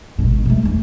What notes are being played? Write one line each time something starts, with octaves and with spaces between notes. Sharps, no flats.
G#1 B2
D#3 A3
E2 A3